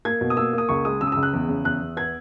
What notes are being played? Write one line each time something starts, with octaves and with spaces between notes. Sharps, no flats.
A#3 G#6
B2
D#6
A#3 E6
A#3 D#6
C#2 C#6
G#3 D#6
C#3 E6
D#6
C#2 E6
F#6
E2
C#3
E2 F#6
E2
B3 G#6